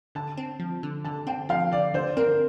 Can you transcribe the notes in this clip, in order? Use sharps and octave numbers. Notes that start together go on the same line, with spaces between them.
D3 A5
C4
F3
D3
D3 A5
C4 G5
F3 F5
D3 D5
D3 C5
C4 A#4